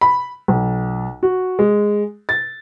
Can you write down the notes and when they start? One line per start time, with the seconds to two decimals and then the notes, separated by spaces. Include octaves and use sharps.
0.01 B5
0.48 B1
1.23 F#4
1.59 G#3
2.29 A6